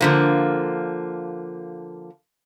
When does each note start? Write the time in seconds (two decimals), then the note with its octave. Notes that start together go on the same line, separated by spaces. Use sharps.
0.01 D3 F3 A#3